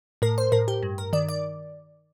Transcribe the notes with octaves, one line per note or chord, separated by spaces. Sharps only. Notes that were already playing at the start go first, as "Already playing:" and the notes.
A2 A#4
C5
A2 A#4
G4
G2
A#4
D#3 D5
D5